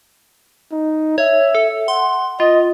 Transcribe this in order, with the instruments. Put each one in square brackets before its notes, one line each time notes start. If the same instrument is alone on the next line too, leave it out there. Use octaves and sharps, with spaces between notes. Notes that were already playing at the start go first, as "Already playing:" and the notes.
[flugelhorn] D#4
[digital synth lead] C#5 [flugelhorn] E5
[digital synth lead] A4
[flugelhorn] F#5 [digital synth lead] C6
[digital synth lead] F4 [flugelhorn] D#5